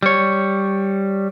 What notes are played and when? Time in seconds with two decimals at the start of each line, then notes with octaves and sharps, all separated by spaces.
0.03 G3 C#5